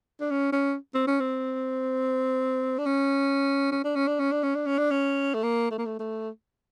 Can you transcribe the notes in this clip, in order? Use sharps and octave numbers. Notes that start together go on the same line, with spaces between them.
D4
C#4
C#4
C4
C#4
C4
D4
C#4
C#4
D4
C#4
D4
C#4
D4
C#4
D4
C#4
D4
C#4
A3
A#3
A3
A#3
A3
A3